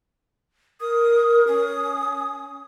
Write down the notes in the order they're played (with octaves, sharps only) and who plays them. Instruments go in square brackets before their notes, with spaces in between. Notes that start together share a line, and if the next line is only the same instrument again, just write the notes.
[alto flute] A#4 [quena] D#6
[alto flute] C#4 [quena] D#6